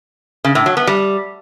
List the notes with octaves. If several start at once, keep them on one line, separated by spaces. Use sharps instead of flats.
C#3
A2
F#3
B3
G3